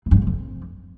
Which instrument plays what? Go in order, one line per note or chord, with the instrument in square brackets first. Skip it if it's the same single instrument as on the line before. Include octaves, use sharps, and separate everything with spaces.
[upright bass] E3
G2
G#2
C3
F2